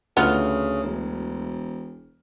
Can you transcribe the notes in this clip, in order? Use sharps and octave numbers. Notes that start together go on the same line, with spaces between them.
D2 C#3 B3 F4 F6
E1